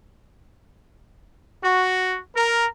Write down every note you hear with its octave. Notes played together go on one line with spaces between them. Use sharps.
F#4
A#4